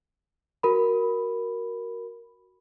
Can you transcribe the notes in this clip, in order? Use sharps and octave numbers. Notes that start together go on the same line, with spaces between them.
F#4 A#4 B5